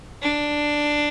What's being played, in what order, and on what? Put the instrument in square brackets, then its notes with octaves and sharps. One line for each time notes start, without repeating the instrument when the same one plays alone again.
[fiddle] D4